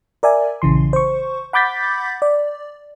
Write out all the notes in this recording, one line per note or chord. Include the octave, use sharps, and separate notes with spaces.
A#4 D5 E5 G#5
A#1 C#3 E3 C6
C5 C#6
F#5 B5 D6 G6 A6 B6
D5